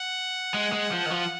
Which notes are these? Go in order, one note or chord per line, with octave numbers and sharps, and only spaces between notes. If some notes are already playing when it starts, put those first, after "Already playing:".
Already playing: F#5
G#3
G#3
F3
D#3
F3